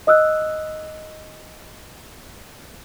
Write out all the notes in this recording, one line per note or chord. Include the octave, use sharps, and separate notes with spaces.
D#5 D#6 E6 F#6